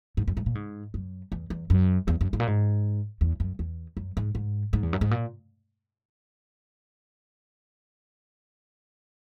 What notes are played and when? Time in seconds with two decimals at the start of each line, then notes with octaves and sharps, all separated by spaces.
0.17 G#2
0.28 F#2
0.37 G#2
0.46 A#2
0.55 G#2
0.94 F#2
1.32 E2
1.50 E2
1.70 F#2
2.08 E2
2.21 F#2
2.33 G#2
2.40 A#2
2.47 G#2
3.21 E2
3.40 F#2
3.59 E2
3.97 F#2
4.17 G#2
4.35 G#2
4.73 G#2
4.83 E2
4.93 F#2
5.01 G#2
5.11 A#2